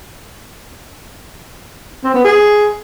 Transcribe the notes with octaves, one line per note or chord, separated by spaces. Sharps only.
C4
B3
G#4